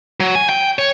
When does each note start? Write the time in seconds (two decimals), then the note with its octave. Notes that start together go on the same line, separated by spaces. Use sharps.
0.20 F#3
0.35 G#5
0.49 G5
0.79 C#5